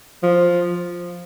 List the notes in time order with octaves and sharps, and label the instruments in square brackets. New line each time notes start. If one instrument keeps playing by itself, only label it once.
[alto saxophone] F3